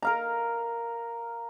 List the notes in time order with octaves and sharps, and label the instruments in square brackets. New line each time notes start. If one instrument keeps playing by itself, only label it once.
[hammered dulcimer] A#4 F5 A#5